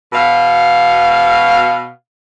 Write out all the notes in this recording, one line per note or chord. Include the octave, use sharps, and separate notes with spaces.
B2 F5